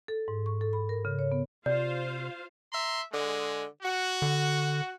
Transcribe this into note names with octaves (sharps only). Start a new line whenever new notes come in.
A4
G#2
C#6
A4
B5
A#4
C#3
C#5
B3
C3 F4 C5 D5 F5
E5 A#5 C6
D3 G#3
F#4
D3